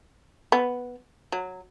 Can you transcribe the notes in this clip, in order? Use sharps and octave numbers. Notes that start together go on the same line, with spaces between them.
B3
F#3